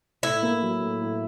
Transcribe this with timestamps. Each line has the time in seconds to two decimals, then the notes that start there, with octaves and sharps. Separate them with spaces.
0.23 A2 E4
0.42 A#3
0.62 F#3
0.82 A2
1.01 A2